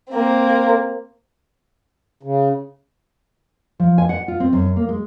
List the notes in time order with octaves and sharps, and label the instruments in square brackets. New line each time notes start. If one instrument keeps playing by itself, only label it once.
[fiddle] A#3 C4
[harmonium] C#3
[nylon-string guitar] F3
G#5
F#5
F4
C4
F#2
A#3
G#3